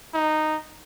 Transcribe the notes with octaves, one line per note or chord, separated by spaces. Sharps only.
D#4